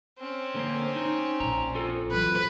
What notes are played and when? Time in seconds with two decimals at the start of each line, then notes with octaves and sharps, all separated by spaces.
0.18 C4 C#4
0.55 D3 A#3 C5
0.96 D#4
1.40 A#1 A#5
1.75 F4 A4
2.12 E3 F#3 B4